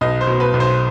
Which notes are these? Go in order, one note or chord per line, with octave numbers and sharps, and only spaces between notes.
B1 D#5
C5
B2
B4
B1
C5